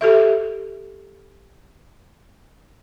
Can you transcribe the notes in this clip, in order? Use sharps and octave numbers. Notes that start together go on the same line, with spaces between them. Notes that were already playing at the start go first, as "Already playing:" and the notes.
G4 A4 E5